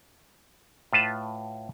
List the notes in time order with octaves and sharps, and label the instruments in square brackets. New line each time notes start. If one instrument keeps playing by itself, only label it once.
[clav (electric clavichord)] A2 F4 B4 A5